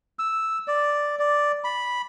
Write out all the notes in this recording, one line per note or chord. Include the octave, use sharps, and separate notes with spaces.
E6
D5
D5
B5